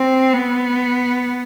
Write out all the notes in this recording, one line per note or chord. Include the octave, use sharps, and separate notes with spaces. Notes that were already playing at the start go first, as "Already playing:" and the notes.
Already playing: C4
B3